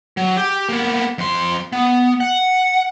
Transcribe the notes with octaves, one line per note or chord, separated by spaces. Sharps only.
F#3
G4
A#3 B3
F2 C6
B3
F#5